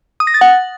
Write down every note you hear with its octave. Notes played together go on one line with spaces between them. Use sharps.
D#6
A#6
A6
F#5